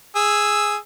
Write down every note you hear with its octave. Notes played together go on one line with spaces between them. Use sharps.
G#4 E6